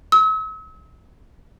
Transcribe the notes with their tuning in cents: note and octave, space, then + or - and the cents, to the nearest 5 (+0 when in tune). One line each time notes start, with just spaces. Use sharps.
E6 -45